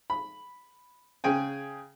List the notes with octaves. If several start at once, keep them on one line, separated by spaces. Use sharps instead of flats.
B5
C#3 G#4 G5 G#5